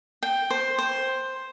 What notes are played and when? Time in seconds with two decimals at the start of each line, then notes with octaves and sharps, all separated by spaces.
0.23 G5
0.50 C5
0.79 C5